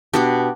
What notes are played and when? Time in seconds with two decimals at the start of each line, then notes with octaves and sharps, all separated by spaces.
0.13 B2 B3 D4 G4